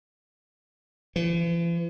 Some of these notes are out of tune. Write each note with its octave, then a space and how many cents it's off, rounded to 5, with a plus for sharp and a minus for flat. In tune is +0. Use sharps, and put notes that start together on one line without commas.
E3 +45